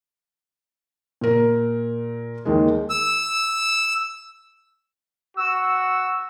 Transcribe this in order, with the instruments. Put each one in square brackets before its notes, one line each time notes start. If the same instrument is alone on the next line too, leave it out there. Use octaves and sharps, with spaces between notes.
[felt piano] A#2 A#4
D#2 D#3 G#3
[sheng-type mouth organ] E6
[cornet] F#4 [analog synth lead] E6